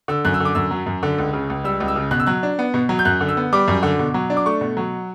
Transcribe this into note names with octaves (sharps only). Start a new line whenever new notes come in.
D3 E6
F#2 F#6
E6
D3 D6
F#2 E6
F#3
F#2
D3
C#2
C#3
C#2
G3 E6
C#2
E6
C#3
B2 F#6
E6
F#3 F#6
D4
B3
B2
F#3
G6
F#2 F#6
D3
E6
B3
G3 D6
F#2
D3
B2
F#3
D4
D6
A3 C#6
B2
F#3